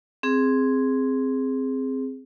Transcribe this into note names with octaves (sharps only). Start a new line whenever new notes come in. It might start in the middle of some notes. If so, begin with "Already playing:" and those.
C4 G#4